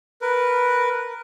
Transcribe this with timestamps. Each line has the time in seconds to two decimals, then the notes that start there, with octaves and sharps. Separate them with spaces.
0.21 A#4 B4